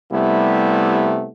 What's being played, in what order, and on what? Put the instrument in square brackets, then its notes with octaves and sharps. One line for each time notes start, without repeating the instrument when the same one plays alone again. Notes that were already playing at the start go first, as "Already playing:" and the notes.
[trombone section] C3 G3 A3 B3 E4